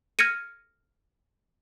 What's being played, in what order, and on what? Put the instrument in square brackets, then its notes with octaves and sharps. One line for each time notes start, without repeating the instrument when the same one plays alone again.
[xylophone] F6 G#6 A#6 C#7 D#7